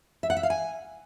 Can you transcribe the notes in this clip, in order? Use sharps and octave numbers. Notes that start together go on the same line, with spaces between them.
E5
F#5
E5
F5
G#5